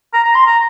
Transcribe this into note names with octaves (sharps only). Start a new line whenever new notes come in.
A#5
A#5
C6
A#5